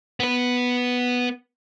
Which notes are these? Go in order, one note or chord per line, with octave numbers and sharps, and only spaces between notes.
B3 B4